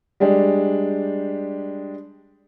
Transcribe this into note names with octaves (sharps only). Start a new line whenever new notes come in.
G3 G#3 D4 G4